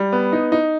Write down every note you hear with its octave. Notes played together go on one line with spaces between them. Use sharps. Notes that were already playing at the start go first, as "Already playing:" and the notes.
Already playing: G3
B3
D#4
D#4